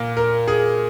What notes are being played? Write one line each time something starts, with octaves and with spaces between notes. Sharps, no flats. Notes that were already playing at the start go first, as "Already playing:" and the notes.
Already playing: A#2 A#3 A#4
A#4
G#4